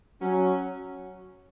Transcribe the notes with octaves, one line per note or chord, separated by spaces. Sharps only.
F#3 C#4